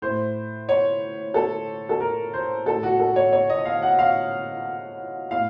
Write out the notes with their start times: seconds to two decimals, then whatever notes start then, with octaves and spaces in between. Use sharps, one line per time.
0.02 A2 C5
0.69 C#5
1.34 A4
1.89 A4
2.00 A#4
2.33 C5
2.66 A2 A4
2.83 F#4
3.00 A4
3.16 C#5
3.33 C#5
3.50 D#5
3.65 F5
3.82 F#5
3.99 F5
5.31 A2 F5